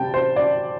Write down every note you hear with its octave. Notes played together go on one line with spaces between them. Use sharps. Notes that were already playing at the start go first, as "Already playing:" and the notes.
Already playing: C3 G3 C4 G5 A5
C5
D5